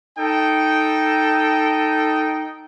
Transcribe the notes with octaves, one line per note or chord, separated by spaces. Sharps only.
D#4 A4 G5